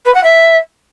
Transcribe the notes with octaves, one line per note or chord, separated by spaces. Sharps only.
B4
F#5
E5